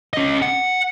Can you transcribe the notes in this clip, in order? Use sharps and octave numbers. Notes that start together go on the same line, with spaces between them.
C#4 D#5
F#5